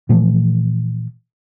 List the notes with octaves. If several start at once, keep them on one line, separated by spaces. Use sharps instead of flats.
A#2 E3 F3 A3